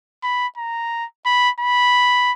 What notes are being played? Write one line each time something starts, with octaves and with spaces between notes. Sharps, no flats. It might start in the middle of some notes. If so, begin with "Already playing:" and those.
B5
A#5
B5
B5